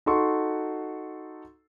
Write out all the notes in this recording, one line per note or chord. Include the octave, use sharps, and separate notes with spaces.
D#4 F#4 A4 C6 C#6